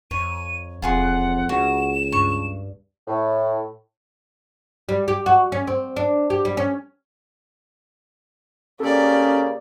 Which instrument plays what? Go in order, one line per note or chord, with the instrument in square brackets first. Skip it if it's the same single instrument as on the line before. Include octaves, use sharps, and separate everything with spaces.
[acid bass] F2 [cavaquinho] C#5 [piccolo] D#7
[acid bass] E1 [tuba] F2 [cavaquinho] F4 G#4 C6 [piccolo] F#5
[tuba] C#2 [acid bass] C#3 [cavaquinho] F#4 [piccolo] E7
[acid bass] G2 [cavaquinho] C#6
[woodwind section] A2
[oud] G3
G4
F#4
C#4
C4
D4
G4
G3
C#4
[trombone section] C#3 A#3 [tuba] C#4 [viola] G4 D5 [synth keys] A4